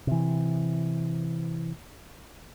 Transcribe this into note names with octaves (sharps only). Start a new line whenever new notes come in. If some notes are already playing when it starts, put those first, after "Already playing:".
C3 E3